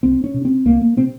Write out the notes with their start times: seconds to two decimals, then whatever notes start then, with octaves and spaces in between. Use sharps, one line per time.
0.03 C2 C4
0.24 C#4
0.34 C3
0.45 C4
0.65 C2 A#3
0.81 A#3
0.97 C3 C4